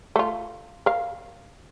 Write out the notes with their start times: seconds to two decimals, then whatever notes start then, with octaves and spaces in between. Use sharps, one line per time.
0.16 A3 F4
0.86 A#4 F5